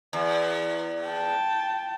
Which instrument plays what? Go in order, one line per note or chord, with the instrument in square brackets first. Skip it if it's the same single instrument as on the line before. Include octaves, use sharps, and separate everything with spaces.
[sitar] E2
[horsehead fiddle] G5 A5